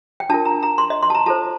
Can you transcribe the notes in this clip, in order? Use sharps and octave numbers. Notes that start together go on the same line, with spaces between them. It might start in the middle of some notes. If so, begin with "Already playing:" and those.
G5
D4 F4 A#4 A5
A#5
A#5
C6
D#5
C6
A5
A#5
F4 A4 C5 A5